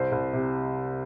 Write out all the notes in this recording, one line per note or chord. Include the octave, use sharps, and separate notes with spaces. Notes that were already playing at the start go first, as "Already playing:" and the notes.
Already playing: C2 C5
C2
C3